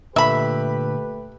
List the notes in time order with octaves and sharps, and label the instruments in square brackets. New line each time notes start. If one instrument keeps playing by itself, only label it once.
[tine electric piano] A#2 D3 [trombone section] A3 G4 B4 [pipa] E5 B5